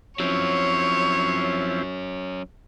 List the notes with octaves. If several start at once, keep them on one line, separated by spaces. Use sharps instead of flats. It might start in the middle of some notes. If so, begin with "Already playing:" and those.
F3 F#3 C4 C#4 E4 C#5